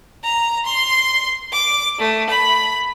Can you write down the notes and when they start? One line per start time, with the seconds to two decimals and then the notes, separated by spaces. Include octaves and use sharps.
0.24 A#5
0.66 C6
1.53 D6
1.98 A3
2.30 B5